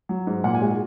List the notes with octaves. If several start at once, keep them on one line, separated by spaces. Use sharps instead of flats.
F#3
G#2
A#2 F#5
G#5
G#3 F#4 F#5